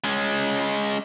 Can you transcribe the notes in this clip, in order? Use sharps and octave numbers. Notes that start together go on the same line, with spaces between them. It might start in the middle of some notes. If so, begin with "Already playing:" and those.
G#3 C#4